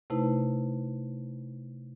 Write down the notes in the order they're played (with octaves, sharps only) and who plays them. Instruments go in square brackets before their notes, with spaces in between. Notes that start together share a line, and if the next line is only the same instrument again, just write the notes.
[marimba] C3 A3 D#4 E4 B4